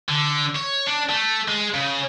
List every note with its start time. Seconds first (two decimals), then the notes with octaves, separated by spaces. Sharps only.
0.09 D3
0.55 C#5
0.87 D4
1.09 A3
1.48 G#3
1.74 C#3